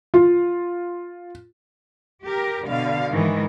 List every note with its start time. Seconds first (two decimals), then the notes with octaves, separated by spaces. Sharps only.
0.14 F4
2.24 G4 A#4
2.67 B2 D3 F5
3.12 G#2 D#3 E3